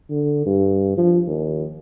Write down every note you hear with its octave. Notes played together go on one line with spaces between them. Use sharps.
D3
G2
F3
D#2